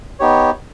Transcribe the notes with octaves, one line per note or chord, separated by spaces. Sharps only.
B3 D#4 G4 C#5